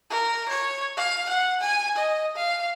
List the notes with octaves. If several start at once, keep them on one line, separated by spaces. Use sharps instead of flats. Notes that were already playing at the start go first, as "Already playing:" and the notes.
A#4
C#5
F5
F#5
G#5
D#5
F5